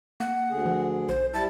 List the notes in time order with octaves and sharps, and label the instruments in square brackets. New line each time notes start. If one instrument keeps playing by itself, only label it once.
[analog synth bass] A#3 [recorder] F#5
[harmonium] D2 D3 G#4
[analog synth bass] F3
[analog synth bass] B1 [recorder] C5
[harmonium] G3 E4 [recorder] A5